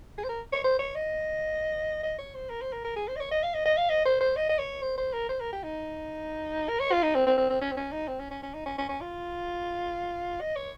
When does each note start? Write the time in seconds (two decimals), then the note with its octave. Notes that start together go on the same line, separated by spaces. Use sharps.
0.18 G#4
0.24 C5
0.29 A#4
0.52 C#5
0.64 C5
0.79 C#5
0.95 D#5
2.03 D#5
2.18 C#5
2.34 C5
2.50 A#4
2.61 C5
2.73 A#4
2.84 A#4
2.96 G#4
3.08 C5
3.16 D#5
3.20 C#5
3.31 D#5
3.43 F5
3.54 D#5
3.65 D#5
3.77 F5
3.89 D#5
4.05 C5
4.20 C5
4.36 D#5
4.49 D#5
4.58 C#5
4.82 C5
4.98 C5
5.13 A#4
5.29 C5
5.40 A#4
5.52 G4
5.63 D#4
6.68 A#4
6.79 C#5
6.92 F4
7.03 D#4
7.15 C4
7.27 C4
7.37 C4
7.50 C4
7.61 C#4
7.71 C4
7.77 C#4
7.92 D#4
8.08 C4
8.19 C#4
8.30 C#4
8.42 C#4
8.54 D#4
8.66 C#4
8.78 C#4
8.89 C#4
9.01 F4
10.40 D#5
10.56 C#5